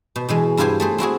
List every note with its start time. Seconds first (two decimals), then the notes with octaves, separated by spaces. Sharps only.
0.16 B2
0.29 B2 E3 G#3
0.57 G2 E4 F4 G4 C5 G#5
0.80 A3 G#4 C5
0.98 C4 E4 F#4 G#4